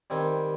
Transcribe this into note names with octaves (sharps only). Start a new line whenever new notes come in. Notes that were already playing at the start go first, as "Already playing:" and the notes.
D#3 G3 C4 G#5